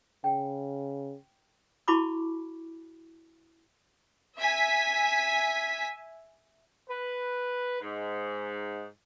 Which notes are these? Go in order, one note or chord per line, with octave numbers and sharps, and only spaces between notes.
C#3 G5
E4 F#4 A5 B5 C#6 D6
E5 G#5 B6
B4
G#2